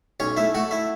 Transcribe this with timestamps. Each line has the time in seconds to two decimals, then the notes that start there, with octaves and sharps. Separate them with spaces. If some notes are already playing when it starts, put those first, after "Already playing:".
0.20 B1 C#4 C#5
0.37 A3 E4 E5
0.54 A3 F#4 F#5
0.71 E4 E5